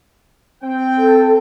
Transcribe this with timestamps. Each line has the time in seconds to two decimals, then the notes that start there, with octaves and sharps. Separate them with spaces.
0.63 C4 G5
0.99 A4